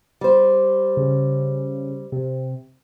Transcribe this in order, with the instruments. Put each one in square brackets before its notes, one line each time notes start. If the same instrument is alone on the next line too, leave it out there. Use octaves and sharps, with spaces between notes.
[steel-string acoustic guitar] G3 C5
[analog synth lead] C#3
C3